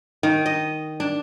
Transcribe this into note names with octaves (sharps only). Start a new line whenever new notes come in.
D#3
D#5
D4